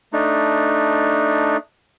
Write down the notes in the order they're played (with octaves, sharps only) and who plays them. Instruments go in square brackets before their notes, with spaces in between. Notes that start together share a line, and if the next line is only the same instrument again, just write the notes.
[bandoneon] A3 D4 D#4